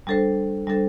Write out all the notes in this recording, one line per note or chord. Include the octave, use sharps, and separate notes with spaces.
G3 D4 A4 C5
G3 D4 A4 C5